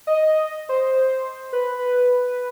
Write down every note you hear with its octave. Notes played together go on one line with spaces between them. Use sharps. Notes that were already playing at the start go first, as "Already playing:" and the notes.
D#5
C5
B4